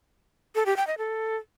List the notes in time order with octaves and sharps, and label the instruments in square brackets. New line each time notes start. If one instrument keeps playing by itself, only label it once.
[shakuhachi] A4
G4
G5
D#5
A4